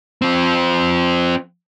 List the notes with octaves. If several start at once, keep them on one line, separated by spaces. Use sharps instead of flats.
F3 C4